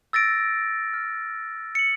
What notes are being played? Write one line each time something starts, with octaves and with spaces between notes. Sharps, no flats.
E6 A6 A#6 D7
F6
C#7 F#7